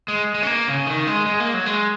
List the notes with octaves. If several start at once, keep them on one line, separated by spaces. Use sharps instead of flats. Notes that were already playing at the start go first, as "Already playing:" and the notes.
G#3
G#3
C#4
A#3
C#3
D#3
G#3
G#3
A#3
F#3
G#3